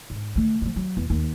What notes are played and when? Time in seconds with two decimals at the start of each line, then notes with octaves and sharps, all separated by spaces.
0.10 G#2
0.35 D3 A3
0.61 D3 F3
0.76 F#3
0.97 E2
1.10 D#2